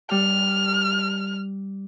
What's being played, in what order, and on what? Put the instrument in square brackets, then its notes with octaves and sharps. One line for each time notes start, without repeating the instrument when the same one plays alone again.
[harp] G3 [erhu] F6